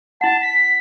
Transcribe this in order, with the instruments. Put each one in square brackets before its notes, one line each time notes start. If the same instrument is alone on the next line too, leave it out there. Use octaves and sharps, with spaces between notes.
[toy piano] E4 F#5 [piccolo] A5
[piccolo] B6